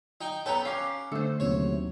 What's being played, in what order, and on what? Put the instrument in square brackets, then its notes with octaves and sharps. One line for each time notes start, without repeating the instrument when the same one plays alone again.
[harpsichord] D#4 G5
[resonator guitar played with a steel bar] B3 A#5 [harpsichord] A4 B4 G5 [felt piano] C#5 F#6
[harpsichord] C#4 [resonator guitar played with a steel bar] G4 F5
[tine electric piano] D3 A3 [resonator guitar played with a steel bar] A4 C5
[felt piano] D#2 C3 F#3 [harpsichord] C#5